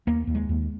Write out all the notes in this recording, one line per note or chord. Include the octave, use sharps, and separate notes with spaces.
D#2 A#3
D#2
G#3
D#2